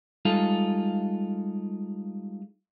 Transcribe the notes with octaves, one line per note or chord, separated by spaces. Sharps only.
G3 G#3 D#4 F4 A4